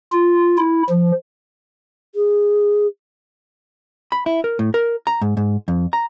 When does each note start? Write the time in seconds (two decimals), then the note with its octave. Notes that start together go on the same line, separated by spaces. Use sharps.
0.13 F4
0.58 E4
0.89 F3
2.15 G#4
4.12 B5
4.26 E4
4.44 A#4
4.59 A2
4.74 A#4
5.07 A#5
5.21 G#2
5.37 G#2
5.68 F2
5.93 A#5